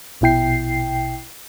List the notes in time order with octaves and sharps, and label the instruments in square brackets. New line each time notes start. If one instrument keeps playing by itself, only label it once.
[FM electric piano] A#1 B2 E4 G5 C7